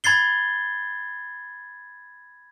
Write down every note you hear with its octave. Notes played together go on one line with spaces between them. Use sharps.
B5 G#6 A6 C7 G7